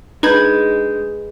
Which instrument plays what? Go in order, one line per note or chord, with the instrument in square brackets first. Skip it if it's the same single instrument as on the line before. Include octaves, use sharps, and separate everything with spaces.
[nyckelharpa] G#3 [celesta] D4 G6 [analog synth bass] D#4 [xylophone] B4 B5 G#6